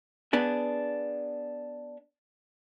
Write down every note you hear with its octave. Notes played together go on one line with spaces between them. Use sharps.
B3 D4 G#4